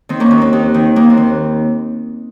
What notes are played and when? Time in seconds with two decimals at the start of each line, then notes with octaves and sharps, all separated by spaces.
0.09 D#3 C4
0.20 A#3 C#4
0.31 D#2 C4
0.42 C4
0.53 D#2
0.74 D#3
0.96 D#2 A#3
1.10 C4
1.17 D#2